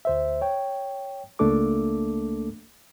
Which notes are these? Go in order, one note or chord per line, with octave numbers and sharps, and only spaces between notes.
D2 C5 E5
C#5 G5
C#2 A3 A#3 D4 A4 D6